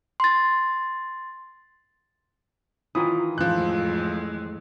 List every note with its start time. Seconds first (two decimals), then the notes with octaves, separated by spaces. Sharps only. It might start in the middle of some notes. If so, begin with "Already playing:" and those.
0.20 C6 A6
2.95 D#3 E3 F4 D#6
3.38 F2 A2 F3 G#3 F#6